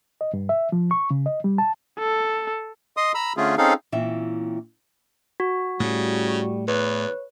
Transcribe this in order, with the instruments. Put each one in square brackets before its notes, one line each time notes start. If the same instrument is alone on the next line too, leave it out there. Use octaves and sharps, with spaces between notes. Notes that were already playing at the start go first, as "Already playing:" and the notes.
[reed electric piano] D#5
G2
E5
F3
C#6
C#3
D#5
G3
A5
[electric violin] A4
[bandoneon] D#5 C6 D#6
A#5 B5 E6
D3 A3 C#4 F4 G#4
C4 C#4 D#4 G#4 A4 F5
[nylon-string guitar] A#2 E3 C4 C#4 E5
[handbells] F#4
[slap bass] A2 A3 [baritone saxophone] C#3 [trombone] G3
[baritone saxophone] E2 [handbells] B4 [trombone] C#5